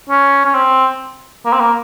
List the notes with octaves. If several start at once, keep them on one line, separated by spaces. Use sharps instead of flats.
C#4
C#4
C4
A#3
C4
A#3